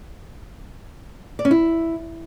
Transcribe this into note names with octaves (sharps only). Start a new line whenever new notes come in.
D5
C#4
E4